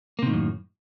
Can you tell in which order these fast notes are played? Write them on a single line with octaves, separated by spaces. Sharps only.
A#3 C3 D#3 A2 F#2